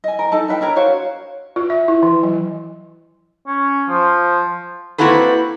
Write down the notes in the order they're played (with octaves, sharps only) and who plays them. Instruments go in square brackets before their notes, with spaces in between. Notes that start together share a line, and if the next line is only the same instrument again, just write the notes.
[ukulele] D#5 G#5
A#4
D#4 A4 A5
D#4 B4 E5 G5
D4 A#4 C#5 A#5
F#4 C5 C#5 F5
[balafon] F4
E5
E4
E3
F#3
[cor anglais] C#4
F3
[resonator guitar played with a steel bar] A#3 C4 E4 F#4 A4 B4